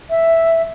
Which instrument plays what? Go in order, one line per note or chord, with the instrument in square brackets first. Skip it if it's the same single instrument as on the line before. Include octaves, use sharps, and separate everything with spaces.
[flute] E5